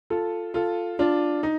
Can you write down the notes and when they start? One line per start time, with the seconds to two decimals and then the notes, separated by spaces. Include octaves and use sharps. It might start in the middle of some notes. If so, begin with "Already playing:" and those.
0.10 F4 A4
0.54 F4 A4
0.99 D4 F4
1.43 D#4